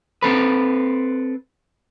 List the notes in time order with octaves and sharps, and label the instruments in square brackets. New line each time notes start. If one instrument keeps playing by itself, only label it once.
[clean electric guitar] C4 A4 B4